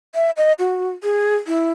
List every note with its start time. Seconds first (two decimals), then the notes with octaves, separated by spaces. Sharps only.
0.15 E5
0.37 D#5
0.59 F#4
1.03 G#4
1.47 E4